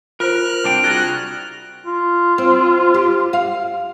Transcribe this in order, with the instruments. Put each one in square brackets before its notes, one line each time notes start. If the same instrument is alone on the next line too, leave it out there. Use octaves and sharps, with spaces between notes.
[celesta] F4 C5 [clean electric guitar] A#4 [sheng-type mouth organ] F6 F#6
[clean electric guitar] C2 D4 G5 [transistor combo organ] C4
[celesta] F4 A6 G7 [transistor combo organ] F#4 G#4 A#5
[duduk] F4
[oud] C4
G4
F5